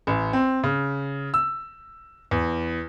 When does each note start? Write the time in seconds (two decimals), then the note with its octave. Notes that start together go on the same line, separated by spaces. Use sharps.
0.07 A1
0.33 C4
0.63 C#3
1.34 E6
2.31 E2